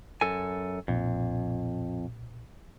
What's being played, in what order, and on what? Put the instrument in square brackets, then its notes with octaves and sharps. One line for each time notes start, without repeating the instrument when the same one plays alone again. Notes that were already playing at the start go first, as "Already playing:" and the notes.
[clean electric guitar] F#2 A4 G#5
[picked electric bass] B1 A#2 [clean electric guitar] F2